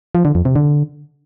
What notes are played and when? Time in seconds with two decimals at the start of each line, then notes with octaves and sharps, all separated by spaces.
0.15 F3
0.25 D3
0.35 F2
0.45 C3
0.56 D3